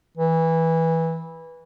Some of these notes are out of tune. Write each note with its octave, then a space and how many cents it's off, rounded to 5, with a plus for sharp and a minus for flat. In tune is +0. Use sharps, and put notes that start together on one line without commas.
E3 -15